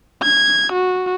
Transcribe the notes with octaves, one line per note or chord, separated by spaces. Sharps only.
G#6
F#4